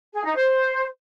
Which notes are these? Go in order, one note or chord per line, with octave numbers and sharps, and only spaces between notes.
G#4
D#4
C5